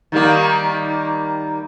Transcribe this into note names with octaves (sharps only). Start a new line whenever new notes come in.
D#3 G3 A#3